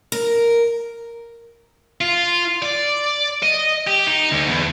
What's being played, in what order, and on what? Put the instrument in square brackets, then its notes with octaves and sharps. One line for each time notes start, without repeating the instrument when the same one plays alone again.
[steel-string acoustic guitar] A#4
[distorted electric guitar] F4
D5
D#5
G4
D#4
D2
E2